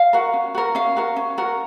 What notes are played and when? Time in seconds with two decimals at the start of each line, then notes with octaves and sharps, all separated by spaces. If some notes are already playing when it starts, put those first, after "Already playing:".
Already playing: F5
0.13 F#4 A#4
0.33 C#4
0.55 F#4 A#4
0.75 C#4 F5
0.96 F#4 A#4
1.16 C#4
1.38 F#4 A#4